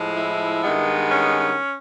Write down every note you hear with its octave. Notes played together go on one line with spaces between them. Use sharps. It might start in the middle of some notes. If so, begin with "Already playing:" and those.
Already playing: A2 F3 G#3
E4
G2 D#3 G#3 B3
C#4